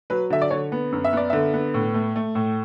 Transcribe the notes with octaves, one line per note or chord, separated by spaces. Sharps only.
F#3 B4
D3 E5
D5
D3 C#5
B3
F#2
E5
B3 D5
D3 E5
B3
A2
A3
A3
A2